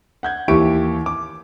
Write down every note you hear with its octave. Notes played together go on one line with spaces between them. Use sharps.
F#5 G6 G#6
D#2 E3 E4 G4 C#6 D7
D6